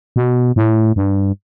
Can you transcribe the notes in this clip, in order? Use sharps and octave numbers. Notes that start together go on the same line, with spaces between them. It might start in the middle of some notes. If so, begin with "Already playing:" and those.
B2
A2
G2